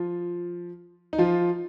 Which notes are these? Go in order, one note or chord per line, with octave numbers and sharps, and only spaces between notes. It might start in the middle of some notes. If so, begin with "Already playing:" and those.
Already playing: F3 F4
D#4
F3 F4